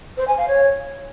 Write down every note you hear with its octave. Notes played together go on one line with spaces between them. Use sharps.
C5
G#5
F5
C#5